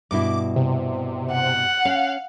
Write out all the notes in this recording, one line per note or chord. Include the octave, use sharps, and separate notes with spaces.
G2 B2 E4 D6
C3
F#5
C#4 F5